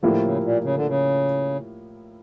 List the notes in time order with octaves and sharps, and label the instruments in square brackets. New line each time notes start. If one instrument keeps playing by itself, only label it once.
[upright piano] A2 F3 A#3 E4 G4 [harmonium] D3
[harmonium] C#3
A#2
C#3
D3
C#3